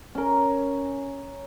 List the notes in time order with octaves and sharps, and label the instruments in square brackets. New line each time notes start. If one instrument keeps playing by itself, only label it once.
[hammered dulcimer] C#4 A#4